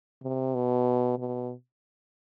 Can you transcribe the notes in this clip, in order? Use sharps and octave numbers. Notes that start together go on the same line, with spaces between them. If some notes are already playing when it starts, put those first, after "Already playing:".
C3
B2
B2